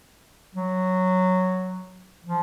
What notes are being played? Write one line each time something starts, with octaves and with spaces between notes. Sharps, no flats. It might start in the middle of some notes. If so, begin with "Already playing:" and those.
F#3
F3